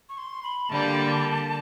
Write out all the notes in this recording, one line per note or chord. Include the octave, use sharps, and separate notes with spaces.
C#6
C6
B5
D3 G3 A#3 A5